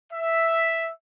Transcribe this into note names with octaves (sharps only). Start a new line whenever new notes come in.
E5